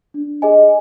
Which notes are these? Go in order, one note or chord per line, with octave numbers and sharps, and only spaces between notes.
D4
G#4 D#5 G#5